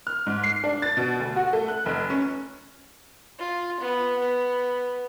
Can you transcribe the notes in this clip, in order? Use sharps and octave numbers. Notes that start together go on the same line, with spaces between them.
F6
G#2
C7
D4
A6
B2
D2
F#4
A3
F#6
F1
C#4
F4
B3
B3